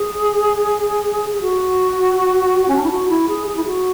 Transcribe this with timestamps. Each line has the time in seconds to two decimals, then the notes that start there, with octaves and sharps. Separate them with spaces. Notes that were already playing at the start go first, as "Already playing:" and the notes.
Already playing: G#4
1.33 G#4
1.41 F#4
2.68 C#4
2.76 D4
2.84 E4
2.91 F#4
3.09 E4
3.28 G#4
3.47 G#4
3.56 E4
3.66 F#4